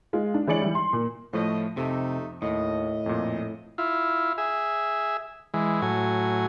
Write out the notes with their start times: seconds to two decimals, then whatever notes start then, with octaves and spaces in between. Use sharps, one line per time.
0.13 G#3 F4
0.34 D4
0.47 E3 G#3 C#5 D5 C#7 F#7
0.62 E3 G3
0.75 C6
0.93 A#2
1.33 A2 F3 A3 F4 C#5 D#5
1.77 F2 C3 A3 D#4
2.42 D#2 A2 D#5
3.06 F2 A#2
3.78 E4 F4
4.38 G#4 E5
5.54 E3 G#3
5.82 A2 F#3 G#5